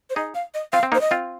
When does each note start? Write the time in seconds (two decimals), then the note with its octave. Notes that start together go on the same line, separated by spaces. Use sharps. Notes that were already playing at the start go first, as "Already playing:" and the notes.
0.10 C5
0.16 D#4 G#4 D#5
0.35 F5
0.54 D#5
0.73 C4 F4 F5
0.83 C4
0.92 A#3 D#4
0.95 C5
1.01 D#5
1.11 C4 F4